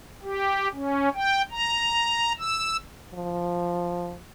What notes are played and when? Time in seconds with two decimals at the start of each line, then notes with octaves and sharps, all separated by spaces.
0.22 G4
0.73 C#4
1.14 G5
1.51 A#5
2.38 E6
3.14 F3